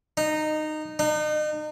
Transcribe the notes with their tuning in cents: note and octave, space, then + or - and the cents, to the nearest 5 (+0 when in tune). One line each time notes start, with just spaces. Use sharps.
D#4 -15
D#4 -35